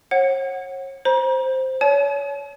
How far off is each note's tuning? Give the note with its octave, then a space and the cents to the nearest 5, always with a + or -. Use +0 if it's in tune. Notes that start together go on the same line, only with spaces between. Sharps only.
C#5 -40 F#5 +0
C5 +0 A#5 +40
C#5 +30 A5 -45